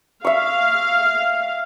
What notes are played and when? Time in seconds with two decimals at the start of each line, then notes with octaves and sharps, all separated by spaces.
0.25 E5 F5 C#6